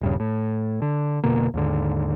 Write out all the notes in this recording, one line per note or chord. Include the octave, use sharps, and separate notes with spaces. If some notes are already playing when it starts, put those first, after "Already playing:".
D#1 G2 C#3
A2
D3
F1 B2 D3 A#3
D#2 G#2 D3